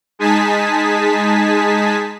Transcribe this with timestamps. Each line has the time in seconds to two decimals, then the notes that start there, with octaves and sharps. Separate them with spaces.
0.19 G#3 D#4 G#4 G#5 A5 B6